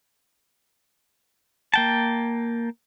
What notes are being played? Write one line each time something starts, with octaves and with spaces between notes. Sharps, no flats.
A#3 G5 A5